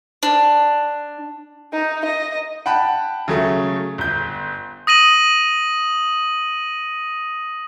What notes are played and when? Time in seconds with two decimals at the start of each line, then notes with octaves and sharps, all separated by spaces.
0.23 D4
1.73 D#4
2.05 D#5
2.66 F#5 G5 A5 B5
3.28 C#3 F#3 A3
3.98 G1 G6
4.87 D#6 A#6 D#7 F#7